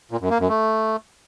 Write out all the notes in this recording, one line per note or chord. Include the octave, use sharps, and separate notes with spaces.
A#2
F#2
A#3
F#2
A3